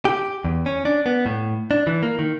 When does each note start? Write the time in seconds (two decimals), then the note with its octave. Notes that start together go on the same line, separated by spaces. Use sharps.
0.05 G4
0.44 E2
0.66 C#4
0.85 D4
1.06 B3
1.26 A2
1.71 D4
1.87 E3
2.03 A#3
2.19 D#3